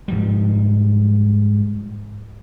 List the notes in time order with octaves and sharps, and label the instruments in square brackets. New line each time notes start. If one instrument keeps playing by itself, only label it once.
[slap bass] G#2 F3 G3